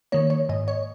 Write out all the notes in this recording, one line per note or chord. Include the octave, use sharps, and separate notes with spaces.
D#3 A#3 C#5
C#5
G#2 D#5
C#5